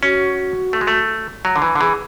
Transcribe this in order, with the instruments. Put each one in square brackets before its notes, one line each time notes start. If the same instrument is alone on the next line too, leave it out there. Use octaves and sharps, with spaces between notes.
[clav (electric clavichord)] C#4 [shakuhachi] F#4
[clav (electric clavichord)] A3
G#3
A3
F#3
D3
E3
D3
[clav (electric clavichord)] E3 [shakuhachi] G#4